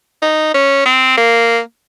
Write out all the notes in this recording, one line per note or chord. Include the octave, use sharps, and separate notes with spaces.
D#4
C#4
C4
A#3